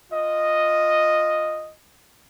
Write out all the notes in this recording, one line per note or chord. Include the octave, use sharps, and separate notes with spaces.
F4 D#5